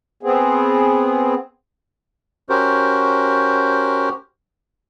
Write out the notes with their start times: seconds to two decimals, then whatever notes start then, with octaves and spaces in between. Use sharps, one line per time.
0.23 B3 C4 G#4
2.49 C#4 F#4 G4 A#4 C5